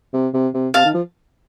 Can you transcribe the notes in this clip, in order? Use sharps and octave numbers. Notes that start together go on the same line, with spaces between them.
C3
C3
C3
C3 F5 A5
D#3
F3